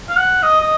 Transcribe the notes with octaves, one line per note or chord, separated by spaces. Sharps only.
F5
F#5
D#5
D#5